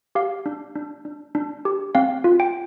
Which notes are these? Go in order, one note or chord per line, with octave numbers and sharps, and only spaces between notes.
G4 F5
D4
D4
D4
D4
G4
C4 F5
F4
G5